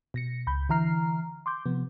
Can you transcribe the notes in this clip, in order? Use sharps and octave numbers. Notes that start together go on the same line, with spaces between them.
B2 A#6 C#7
C#2 B5 G6
D3 E3 E4 A#5 F6 C7
C6 D6 G6
C3 F3 B3